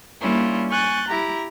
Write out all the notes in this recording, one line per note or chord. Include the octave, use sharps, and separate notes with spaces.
G3 A#3 C#4 D4 E4 F4
G#5 C#6 F#6 G6 A6
E4 G4 A#5